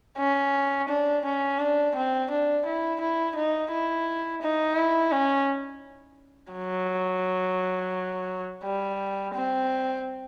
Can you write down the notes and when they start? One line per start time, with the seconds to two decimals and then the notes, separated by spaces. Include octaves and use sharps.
0.18 C#4
0.88 D4
1.25 C#4
1.59 D4
1.95 C4
2.30 D4
2.65 E4
3.00 E4
3.36 D#4
3.71 E4
4.42 D#4
4.77 E4
5.12 C#4
6.52 F#3
8.64 G3
9.35 C4